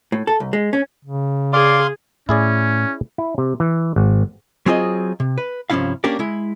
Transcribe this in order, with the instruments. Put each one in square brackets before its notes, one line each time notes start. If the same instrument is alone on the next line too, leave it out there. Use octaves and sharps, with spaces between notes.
[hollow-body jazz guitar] A2
A4
C2
G#3
C#4
[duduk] C#3
[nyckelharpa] G#4 [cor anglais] D5 [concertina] F5 C6
[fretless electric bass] A2 [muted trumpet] C#4 [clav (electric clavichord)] E4 G#4 D5
[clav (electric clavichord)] E4
C3
E3
G#1
[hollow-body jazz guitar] F#3 C4 F4 G#4 C#5 D#5
C3
B4
C2 G2 F3 C#4 E4 F5
A#3 C#4 D4 G4 A#4 D5
G#3 E4